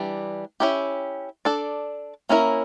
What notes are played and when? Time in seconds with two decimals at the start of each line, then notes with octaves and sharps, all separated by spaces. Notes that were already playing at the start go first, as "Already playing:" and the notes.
Already playing: E3 G3 D4
0.60 C#4 E4 G4
1.45 D4 A4 D5
2.29 A#3 C#4 E4 A#4